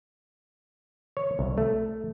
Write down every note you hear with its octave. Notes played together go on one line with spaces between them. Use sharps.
C#5
C2
A3